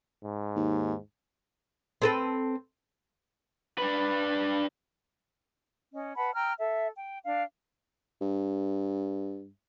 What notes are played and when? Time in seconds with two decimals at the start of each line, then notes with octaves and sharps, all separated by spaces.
0.23 G#2
0.56 D#2
2.02 C4 A4 B4
3.78 D4 B4
5.93 C#4 D#5
6.16 B4 F#5 A5 B5
6.35 G5 A#5 E6 F6
6.59 A4 E5
6.96 G5
7.24 D4 F5
8.21 G2